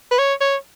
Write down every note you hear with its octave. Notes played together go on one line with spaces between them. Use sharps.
B4
C#5
C#5